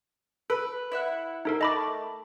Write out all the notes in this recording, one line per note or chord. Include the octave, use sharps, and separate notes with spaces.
A4 B4
E4 E5 F#5
D#4 A4 A#4
A3 D#5 B5 D6